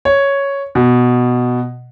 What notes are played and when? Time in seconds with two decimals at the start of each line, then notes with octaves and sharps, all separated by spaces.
0.05 C#5
0.75 B2